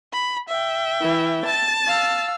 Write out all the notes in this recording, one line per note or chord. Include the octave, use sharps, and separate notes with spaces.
B5
E5 G5
E3
A5 A6
F5 E6